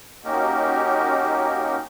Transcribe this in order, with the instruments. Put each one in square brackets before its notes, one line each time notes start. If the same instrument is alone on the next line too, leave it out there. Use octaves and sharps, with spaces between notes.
[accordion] A#3 C#4 D#4 F#4 G4 A#4